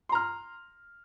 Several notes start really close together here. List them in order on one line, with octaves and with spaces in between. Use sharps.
C6 A#5 F6